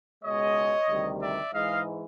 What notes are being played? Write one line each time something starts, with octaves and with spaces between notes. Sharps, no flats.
C#2 B2 G#3 C#5 D#5
D2 C3 D#3 G3
D5 E5
G#2 E3 G#3 D#5 F5